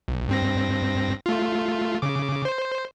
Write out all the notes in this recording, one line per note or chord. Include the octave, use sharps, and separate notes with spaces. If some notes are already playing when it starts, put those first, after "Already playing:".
B1
G2 C4 A#6
A3 F4
C#3 D6
C5